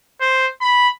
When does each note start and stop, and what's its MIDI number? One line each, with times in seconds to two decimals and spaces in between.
0.21 0.47 72
0.61 0.88 83